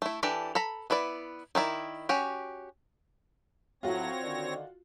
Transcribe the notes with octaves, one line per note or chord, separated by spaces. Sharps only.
A3 E4
E3 D4 G4 A4
A4 A#5 B5
B3 E4 B4 D5
D#3 D#4 E4 D5
C#4 F#4 G4
A2 F#3 C4 F4 F#4 A4 C#5 A#6
D3 D#3 D5